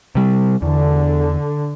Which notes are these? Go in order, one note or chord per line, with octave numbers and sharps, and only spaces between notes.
C3 G3
E2 D3